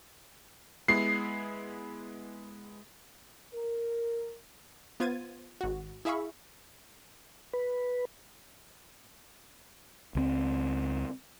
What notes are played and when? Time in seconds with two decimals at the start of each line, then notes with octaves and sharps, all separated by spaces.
0.88 G#3 B3 E4 C7
3.54 A#4
5.00 B3 F4 C5 G#6 A6 D#7
5.61 G#1 F#4
6.05 E4 G#4 E5 F5 B5 C#6
7.54 B4
10.15 C#2 G3 C4